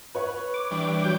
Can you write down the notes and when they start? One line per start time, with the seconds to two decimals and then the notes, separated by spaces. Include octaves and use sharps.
0.15 B4 C#5 C#6
0.54 D6
0.71 E3 G3 D4
1.04 F#3 G6